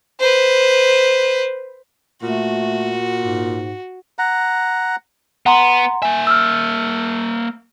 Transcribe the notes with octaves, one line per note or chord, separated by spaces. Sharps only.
B4 C5
A#2 A3 F#4
G#2
F#5 A#5
B3 F#5 A#5 C6
A#3 E5 G#5
E6 F6